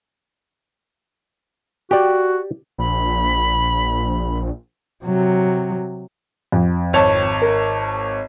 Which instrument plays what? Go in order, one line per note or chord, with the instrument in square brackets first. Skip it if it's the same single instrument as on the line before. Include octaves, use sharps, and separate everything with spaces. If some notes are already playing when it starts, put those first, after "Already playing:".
[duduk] F#4 [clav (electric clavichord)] G4 D5
[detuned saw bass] A#1 [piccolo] B5
[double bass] C3 F#3
[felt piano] F2
[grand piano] G#1 C#5 A5
[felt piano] A#4